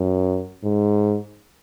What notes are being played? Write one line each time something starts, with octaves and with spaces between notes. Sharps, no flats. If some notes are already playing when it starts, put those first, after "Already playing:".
Already playing: F#2
G#2